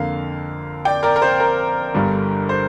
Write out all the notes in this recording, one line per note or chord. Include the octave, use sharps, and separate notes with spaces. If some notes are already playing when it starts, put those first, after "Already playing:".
Already playing: F2 D3 A#3 F5
D5 G5
A#4 D5
A#4
C5
A#4
G1 G2 D3 G3
C5